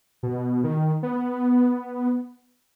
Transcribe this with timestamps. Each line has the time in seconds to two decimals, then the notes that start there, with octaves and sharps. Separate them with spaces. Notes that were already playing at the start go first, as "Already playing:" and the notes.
0.23 B2
0.64 D#3
1.03 B3